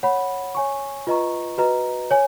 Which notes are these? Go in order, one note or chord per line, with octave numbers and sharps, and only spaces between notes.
C#5 F#5 B5
C#5 G#5 C#6
F4 B4 D#5 A#5 C#6
F#4 B4 D#5 A#5
C#5 G#5